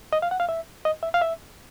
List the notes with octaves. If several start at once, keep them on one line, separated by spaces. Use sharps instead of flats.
D#5
F5
F#5
F5
E5
D#5
E5
F5
E5